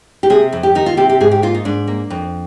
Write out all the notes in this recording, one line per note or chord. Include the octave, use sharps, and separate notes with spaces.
G4
C3 G#4
F2
G4
D#3 D#4
F4
C3 G4
G4
G#2 G#4
G4
A#3 F4
D#4
G#2 D4
A#3
F2